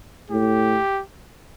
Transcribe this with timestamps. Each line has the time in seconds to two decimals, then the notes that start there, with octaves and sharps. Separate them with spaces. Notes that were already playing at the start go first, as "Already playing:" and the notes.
0.30 A2 G4